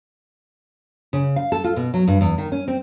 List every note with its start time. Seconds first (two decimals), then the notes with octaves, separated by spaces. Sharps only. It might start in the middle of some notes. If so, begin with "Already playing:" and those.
1.13 C#3
1.36 F5
1.52 A4
1.64 F4
1.76 B2
1.94 F#3
2.08 G2
2.21 E2
2.38 D#3
2.52 C#4
2.68 C4